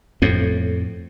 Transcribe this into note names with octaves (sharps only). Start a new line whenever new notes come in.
F2 A2